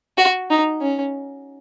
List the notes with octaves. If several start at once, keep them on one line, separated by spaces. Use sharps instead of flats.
F#4
D#4
C#4